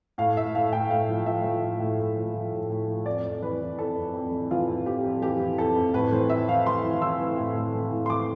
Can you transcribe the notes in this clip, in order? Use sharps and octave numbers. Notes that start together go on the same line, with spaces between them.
A2 F5
A2 E5
A2 F5
A2 G5
A2 F5
F3
F3 E5
F3
A2
A2
A2
F3
F3
A2
A2
F3
F2 D5
F2
E3 B4
E3
F2 A4
F2
F2
E3
E3 F4
F2
F2 G4
F2
E3 G4
E3
F2 A4
F2
A2 B4
E3 C5
E3 E5
E3 F5
E3 C6
E3
E3 E6
E3
A2
A2
E3
A2
C6
E3 D6